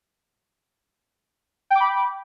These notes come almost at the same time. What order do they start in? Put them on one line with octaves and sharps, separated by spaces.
G5 D6 B5